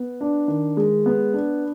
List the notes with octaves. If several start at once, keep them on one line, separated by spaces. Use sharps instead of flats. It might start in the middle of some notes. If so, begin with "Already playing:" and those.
Already playing: B3
D4
D#3
G#3
B3
D4